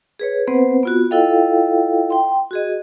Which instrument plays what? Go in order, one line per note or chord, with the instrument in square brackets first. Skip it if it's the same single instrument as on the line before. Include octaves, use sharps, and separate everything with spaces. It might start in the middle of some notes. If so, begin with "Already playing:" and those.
[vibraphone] G#4 B4 C#5
B3 C4 B4 C5 F#5
B3 F4 F#4
E4 F4 A4 D#5 F5 G5
G5 C6
F#4 G#4 D#5